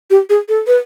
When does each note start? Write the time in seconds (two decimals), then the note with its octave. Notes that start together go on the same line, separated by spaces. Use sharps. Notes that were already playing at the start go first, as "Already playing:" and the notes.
0.10 G4
0.30 G#4
0.49 A4
0.67 B4